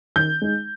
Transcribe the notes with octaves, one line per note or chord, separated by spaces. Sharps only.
D#3 G6
G#3 D#4